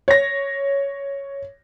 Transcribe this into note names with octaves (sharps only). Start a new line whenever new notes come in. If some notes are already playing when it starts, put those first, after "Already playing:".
C#5 A#6